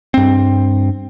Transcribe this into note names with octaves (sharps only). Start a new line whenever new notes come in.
G2 C4